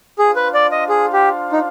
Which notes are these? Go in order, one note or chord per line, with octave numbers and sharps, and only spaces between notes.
D4 F4 G#4 C5 F5
B4
D5
D#5
G#4
G4
D#4